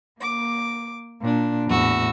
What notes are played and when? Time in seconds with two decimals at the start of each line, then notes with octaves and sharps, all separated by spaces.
0.20 A#3 D6
1.21 A#2 D4
1.67 E2 A2 F#4 E6